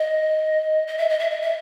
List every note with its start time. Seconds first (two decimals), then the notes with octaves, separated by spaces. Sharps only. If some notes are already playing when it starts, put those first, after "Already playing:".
Already playing: D#5
0.87 D#5
0.98 E5
1.09 D#5
1.19 E5
1.31 D#5
1.41 E5